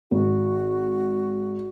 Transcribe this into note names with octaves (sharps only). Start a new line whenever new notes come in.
G#1 F#4